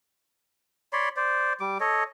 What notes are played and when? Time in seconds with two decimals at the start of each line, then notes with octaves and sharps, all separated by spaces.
0.93 C#5 D5 B5 C6
1.17 C5 D5
1.60 G3 D6
1.80 A4 C#5 D#5